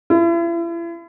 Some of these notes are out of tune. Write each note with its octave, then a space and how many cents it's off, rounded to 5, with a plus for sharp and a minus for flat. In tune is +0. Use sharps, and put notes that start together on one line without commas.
E4 +40